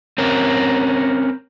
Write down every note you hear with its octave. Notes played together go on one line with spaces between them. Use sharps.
C4 C#4 A#4